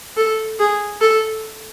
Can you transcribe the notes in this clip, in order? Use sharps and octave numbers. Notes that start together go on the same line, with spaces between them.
A4
G#4
A4